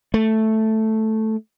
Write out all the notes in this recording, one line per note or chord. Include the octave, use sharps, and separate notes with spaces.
A3